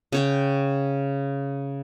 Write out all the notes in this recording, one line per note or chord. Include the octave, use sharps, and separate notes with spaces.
C#3 C#5 G5